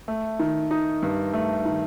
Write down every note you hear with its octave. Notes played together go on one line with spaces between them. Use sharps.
A3
D#3
D#4
G2
A3
D#3